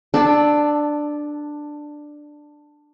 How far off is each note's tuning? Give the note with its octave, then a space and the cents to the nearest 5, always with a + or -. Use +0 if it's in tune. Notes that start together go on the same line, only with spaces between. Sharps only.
D4 +10 A4 -10